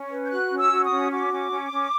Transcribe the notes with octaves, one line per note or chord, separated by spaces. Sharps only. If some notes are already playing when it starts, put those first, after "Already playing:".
Already playing: C#4
B4
G6
F#4 F#6
C#4
E6
F#4
D#6
C#4
F#4 D6
C#4
C#4
C#4